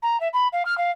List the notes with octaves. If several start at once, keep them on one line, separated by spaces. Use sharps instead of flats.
A#5
E5
B5
F5
F6
F5